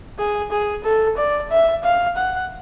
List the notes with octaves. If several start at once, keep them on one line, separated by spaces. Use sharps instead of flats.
G#4
G#4
A4
D5
E5
F5
F#5